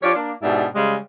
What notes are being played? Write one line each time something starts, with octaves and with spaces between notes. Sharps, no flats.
F3 F4 G4 C#5 D5
A#3 D4
G#2 B2 D4 E4 G4
C#3 G3 G#3